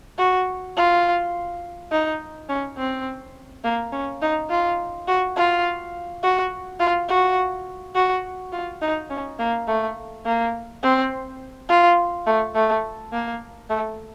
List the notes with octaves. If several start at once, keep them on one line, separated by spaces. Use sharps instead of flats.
F#4
F4
D#4
C#4
C4
A#3
C#4
D#4
F4
F#4
F4
F#4
F4
F#4
F#4
F4
D#4
C#4
A#3
A3
A#3
C4
F4
A3
A3
A#3
A3